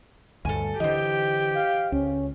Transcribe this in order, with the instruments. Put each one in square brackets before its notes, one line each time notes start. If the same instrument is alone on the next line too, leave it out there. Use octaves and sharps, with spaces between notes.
[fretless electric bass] D2 G2 [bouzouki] A4 G#5
[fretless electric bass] D3 E3 [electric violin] G4 [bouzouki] C5 D#5
[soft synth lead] F5
[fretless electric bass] C#2 [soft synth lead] C#4